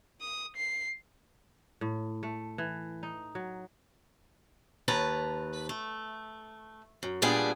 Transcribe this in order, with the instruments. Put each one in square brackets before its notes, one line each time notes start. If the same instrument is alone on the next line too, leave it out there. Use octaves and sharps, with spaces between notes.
[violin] D#6
C7
[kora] A2
A3
E3
D#4
F#3
[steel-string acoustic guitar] D#2 B4 A5 A#5
A3
F#2
A#2 G3 B3 D4 G#4